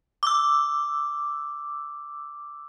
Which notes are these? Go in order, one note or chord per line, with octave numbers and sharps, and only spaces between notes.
D6 E6